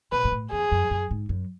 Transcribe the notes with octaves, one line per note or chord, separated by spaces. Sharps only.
B2 B4
G#2
A2
E2 G#4
F#2
F#2
G#2
F#2